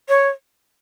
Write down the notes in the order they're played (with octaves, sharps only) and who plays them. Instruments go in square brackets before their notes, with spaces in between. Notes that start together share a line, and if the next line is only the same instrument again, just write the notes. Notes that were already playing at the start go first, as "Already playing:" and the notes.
[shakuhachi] C#5